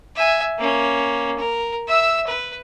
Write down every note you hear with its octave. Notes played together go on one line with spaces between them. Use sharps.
E5 G#5
A#3 C#4
A#4
E5 E6
B4